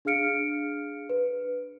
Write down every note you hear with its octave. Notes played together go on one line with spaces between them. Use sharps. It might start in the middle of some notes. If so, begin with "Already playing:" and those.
D4 G#4 F5 F6 C#7 D7
B4